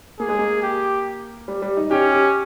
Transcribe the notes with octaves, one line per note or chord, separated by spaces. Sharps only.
A#3 G#4
G#3
A#3
G4
G3
G3
D#4
C#4 G4
G4